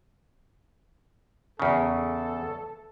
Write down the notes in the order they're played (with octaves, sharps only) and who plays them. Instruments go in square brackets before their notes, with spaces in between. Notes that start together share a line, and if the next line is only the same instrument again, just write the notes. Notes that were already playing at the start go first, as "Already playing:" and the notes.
[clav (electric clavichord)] E2 C#3 [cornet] A4